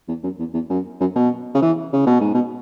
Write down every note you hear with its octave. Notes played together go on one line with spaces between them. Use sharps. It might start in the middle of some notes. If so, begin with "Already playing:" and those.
E2
F#2
E2
E2
F#2
F#2
B2
C#3
E3
C#3
B2
G#2
B2